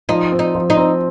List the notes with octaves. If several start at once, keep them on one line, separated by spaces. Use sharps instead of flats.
F3 D#4
C4
D#4
F3
D#4
C4